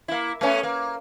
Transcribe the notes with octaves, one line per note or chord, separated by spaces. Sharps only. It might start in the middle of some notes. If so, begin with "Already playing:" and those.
A#3 E4
A3 B3 C#4
A#3